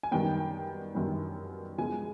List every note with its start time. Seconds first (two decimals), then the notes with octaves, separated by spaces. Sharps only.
0.03 G#5
0.11 F#2 D#3 G3 B3 G5
0.95 F#2 D#3 G3 B3
1.78 C#3 F3 G#3 B3 G#5